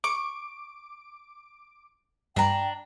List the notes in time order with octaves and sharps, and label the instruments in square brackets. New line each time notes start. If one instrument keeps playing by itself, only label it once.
[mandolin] C#6 [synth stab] D6 D7
[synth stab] G2 [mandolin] D4 A#5 [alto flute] G5